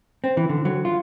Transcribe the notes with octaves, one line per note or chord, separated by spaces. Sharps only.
C4
E3
D3
F#3
F4